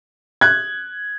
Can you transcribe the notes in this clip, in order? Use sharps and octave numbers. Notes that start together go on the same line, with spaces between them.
F#6 G#6